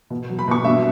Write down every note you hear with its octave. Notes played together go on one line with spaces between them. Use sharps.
B2
F#3
B5
B2 C#6
G2 E5